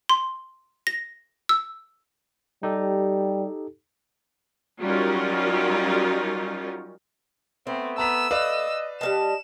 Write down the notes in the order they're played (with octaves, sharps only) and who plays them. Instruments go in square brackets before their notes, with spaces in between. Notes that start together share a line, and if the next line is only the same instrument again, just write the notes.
[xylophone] C6
A#6
E6
[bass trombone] G3 [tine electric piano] D#4 G4 A4
[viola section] F#3 G3 C#4 D#4 F4 A#4
[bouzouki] A3 [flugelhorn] B3 [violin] C4
[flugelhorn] B3 [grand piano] A5 A#5 B6 [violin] E6
[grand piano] B4 D5 F5 [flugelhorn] D#5
[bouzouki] G3 A#3 A5 [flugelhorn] D#5 [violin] E7